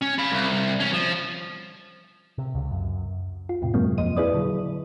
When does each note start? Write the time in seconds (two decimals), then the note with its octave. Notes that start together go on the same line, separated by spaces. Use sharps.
0.02 C#4
0.18 F5 B5
0.32 C2
0.80 E2 C#4
0.94 F3
2.38 C3
2.55 C#2
2.71 F#2
3.49 F4
3.62 E2 A2 C3
3.74 F#2 C3 F#3 G#3 A#3 C4
3.98 E2 F3 D#5 D#7
4.17 E4 G#4 B4 D5 D#6
4.33 A#2 D3 F#3